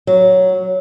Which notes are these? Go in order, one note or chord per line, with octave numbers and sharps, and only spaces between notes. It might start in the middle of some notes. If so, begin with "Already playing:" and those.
F#3